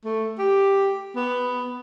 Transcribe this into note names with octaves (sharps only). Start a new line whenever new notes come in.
A3
G4
B3